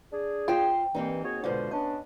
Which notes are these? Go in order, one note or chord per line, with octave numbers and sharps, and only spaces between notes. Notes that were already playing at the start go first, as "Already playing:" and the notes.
D4 G#4
F4 C5 G5
G2 E3 A#3 C4 D#4
F#4 G#4 C#5
G#2 B2 D3 F4 C5
B3 C#4 D4 D#5